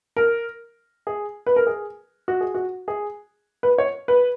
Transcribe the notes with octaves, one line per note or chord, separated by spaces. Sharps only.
A#4
G#4
B4
A#4
G#4
F#4
G#4
F#4
G#4
B4
C#5
B4